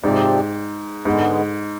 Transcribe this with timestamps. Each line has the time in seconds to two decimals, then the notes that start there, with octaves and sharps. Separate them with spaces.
0.04 G#2 C3 F3 C4 G4 D5
1.05 G#2 D3 G#3 B3